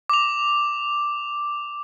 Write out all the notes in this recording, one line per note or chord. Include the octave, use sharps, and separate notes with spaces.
D6 F7